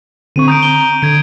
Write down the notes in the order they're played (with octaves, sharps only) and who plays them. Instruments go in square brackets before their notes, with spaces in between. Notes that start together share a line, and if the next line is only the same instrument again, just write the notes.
[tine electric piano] D3 C4 C#6 [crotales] D#7
[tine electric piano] A#5 [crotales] D#6 G6 D7
[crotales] G7
[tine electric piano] D3 [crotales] G#6 D7